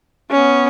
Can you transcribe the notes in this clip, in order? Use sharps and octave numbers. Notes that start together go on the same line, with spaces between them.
B3 C#4